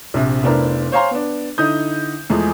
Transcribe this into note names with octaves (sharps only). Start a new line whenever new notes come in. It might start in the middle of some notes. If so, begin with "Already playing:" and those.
A#1 C3
F1 B3 D4 E4 A#4 C5
C5 C#5 F5 G#5 A#5 C6
B3 D4
D3 D#4 E4 D#6 G6
E2 F3 G#3 A3